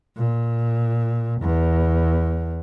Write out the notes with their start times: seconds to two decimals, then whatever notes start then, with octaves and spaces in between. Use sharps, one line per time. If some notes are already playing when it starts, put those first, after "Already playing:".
0.17 A#2
1.41 E2